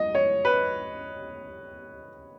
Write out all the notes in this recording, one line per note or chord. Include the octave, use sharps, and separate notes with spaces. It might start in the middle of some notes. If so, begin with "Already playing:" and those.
Already playing: D#5
C#5
B4